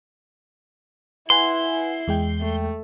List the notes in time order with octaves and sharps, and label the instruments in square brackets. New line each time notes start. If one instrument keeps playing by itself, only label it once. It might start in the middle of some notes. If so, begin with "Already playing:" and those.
[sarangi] E4 [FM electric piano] B4 F#5 G#5 [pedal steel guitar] C6
[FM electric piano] E2 G#3 G5
[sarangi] A3